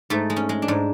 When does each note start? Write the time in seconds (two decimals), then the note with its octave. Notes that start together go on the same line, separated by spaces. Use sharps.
0.10 G#2 A3
0.30 G#3
0.36 C#4
0.49 G#3
0.62 D4
0.68 G#2